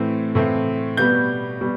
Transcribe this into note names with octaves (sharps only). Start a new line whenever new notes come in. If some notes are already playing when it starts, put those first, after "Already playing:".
Already playing: A2 E3 A3 C4
A2 E3 A3 C4
B2 G3 B3 G6
B2 G3